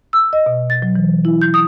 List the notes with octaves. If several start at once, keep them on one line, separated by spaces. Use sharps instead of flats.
E6
D#5
B2
A6
F#3
E3
E4
G6
D#6